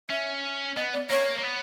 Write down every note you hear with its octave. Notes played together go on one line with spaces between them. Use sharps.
C#4 E5
B3 D#5
D5
A#3 C#5
A#3
B3